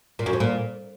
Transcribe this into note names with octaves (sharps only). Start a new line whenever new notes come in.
A#2
F#2
F2
A#2